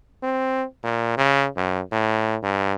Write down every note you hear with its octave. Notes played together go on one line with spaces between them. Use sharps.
C4
A#2
C#3
F#2
A2
G2